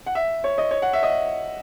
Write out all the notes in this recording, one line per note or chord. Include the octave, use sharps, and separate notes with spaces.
F#5
E5
C#5
D#5
C#5
F#5
E5
D#5